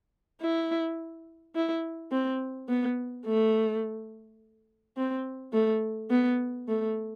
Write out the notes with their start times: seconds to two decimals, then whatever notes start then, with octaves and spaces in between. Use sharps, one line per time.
0.42 E4
1.55 E4
2.12 C4
2.69 B3
3.26 A3
4.97 C4
5.53 A3
6.10 B3
6.68 A3